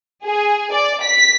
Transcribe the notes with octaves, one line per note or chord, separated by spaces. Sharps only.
G#4
D5
B6